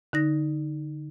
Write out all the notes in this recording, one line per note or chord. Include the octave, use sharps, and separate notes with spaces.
D3 D#4 A#6